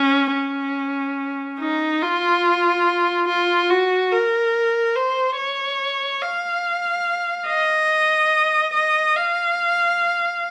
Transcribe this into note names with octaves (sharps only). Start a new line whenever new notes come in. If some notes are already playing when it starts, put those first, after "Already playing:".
Already playing: C#4
C#4
D#4
F4
F4
F#4
A#4
C5
C#5
F5
D#5
D#5
F5